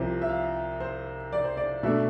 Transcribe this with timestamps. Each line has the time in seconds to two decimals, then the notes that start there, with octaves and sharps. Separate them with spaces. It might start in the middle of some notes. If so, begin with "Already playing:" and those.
Already playing: C2 C3 F3
0.22 E5
0.29 F5
0.80 C5
1.32 D5
1.44 C5
1.57 D5
1.83 B2 A3 D4 E5